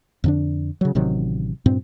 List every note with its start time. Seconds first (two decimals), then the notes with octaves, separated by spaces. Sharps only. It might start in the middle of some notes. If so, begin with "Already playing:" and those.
0.24 F2 D3 D4
0.81 C#3 F#3
0.95 A1 C3 D#3 F#3
1.66 G2 A#2 C4